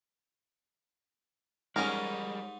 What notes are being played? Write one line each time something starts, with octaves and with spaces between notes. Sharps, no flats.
G#2 G3 G#3 C#4 D#4 G#4 A#4